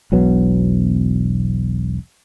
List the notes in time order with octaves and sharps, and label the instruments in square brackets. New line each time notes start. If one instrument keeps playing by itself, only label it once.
[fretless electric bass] E1 B1 F#3 B3